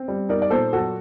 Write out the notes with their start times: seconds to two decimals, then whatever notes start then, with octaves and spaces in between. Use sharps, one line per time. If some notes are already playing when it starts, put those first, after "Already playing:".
Already playing: C4
0.08 G3
0.29 D#4 A#4 D5
0.42 D5
0.50 A#2 A4 C5
0.73 F#3 F#4 A4